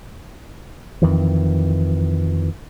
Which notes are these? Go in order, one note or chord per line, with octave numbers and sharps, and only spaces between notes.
F2 D#3 E3